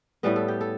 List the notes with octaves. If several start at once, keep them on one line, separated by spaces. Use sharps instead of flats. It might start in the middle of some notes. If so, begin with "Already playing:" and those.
A2 G3 B3 B4
A4
G4
A4